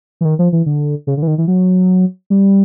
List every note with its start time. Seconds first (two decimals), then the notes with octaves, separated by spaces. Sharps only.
0.21 E3
0.25 D#3
0.39 F3
0.53 E3
0.66 D3
1.07 C#3
1.17 D3
1.22 E3
1.27 D#3
1.38 E3
1.48 F#3
2.30 G3